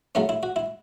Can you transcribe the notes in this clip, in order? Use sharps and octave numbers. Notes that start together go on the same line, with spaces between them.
C#3 F#3 A3 C#4 E4
E4
F#4
E4